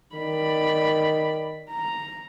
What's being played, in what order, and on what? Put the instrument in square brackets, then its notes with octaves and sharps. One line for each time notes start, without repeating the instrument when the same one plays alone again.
[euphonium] D#3 [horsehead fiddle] D5 B5
[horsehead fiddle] A#5